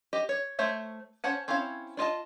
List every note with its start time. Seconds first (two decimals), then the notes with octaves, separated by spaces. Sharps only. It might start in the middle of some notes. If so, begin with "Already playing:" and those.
0.13 G4 D#5
0.29 C#5
0.59 A3 C5 C#5 E5
1.24 C#4 C5 C#5 F#5 A5
1.48 C4 C#4 E4 C#5 F5
1.97 D4 F4 D#5 A5